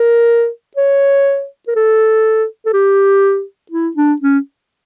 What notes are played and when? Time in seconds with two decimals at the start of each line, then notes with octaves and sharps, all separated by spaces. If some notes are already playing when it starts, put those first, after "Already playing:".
Already playing: A#4
0.77 C#5
1.68 A#4
1.76 A4
2.66 A4
2.74 G4
3.72 E4
3.97 D4
4.21 C#4